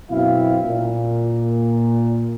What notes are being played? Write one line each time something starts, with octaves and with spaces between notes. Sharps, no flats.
F#2 B2 C4 E4 F5
A#2